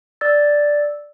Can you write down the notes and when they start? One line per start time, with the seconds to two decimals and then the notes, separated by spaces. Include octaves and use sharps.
0.21 D5 E6 A6